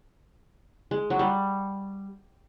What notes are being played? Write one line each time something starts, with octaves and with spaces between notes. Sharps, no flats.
G#3
F#3
G3